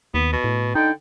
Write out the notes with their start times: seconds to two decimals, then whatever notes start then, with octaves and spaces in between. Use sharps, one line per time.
0.14 D#2 B3
0.33 B2
0.44 A2
0.75 D3 D#4 G5